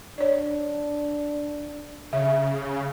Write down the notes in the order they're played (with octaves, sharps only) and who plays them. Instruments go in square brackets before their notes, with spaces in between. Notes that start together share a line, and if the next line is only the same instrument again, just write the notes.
[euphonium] D4 [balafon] C#5 D5
[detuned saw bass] C#3 [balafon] E5